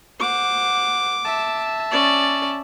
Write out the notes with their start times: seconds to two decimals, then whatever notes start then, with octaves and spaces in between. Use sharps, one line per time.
0.20 C5 F#5 D6
1.25 E5 A5
1.91 C#4 D5